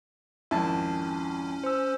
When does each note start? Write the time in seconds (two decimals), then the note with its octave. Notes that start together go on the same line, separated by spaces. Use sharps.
0.51 G#1 F2 C#4 E4 A5
1.64 C5 E6